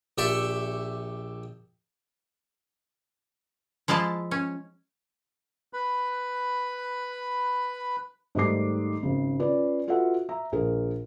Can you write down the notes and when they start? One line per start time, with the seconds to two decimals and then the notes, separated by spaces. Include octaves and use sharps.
0.18 A#1 G4 E5 A5 C#6
3.88 F3 G#3 E4 F4 A5
4.31 C#4
5.73 B4 B5
8.35 G#2 D#3 G3 A3 D6 C7
9.03 G#1 C#3
9.40 C#4 F4 B4 D5
9.88 F4 F#4 A4 B4 E5 F#5
10.29 E5 A#5
10.52 A#1 G#4 A#4